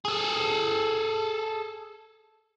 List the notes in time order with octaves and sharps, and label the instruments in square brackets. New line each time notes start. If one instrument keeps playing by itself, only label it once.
[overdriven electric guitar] G#4 A4